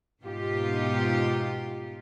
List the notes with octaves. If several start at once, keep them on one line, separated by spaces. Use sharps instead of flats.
G#2 B2 D#4 F4 G4